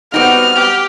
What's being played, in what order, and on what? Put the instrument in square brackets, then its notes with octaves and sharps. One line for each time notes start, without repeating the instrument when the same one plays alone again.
[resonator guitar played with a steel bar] G3 C4 D#4 [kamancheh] B3 F#4 [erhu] F6
[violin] G4